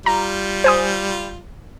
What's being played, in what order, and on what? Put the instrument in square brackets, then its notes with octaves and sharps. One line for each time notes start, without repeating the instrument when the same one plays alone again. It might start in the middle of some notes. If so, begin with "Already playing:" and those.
[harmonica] G3 F4 [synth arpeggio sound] A#5
[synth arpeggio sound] C5 G#5 D#6